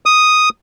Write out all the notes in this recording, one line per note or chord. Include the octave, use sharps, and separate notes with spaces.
D#6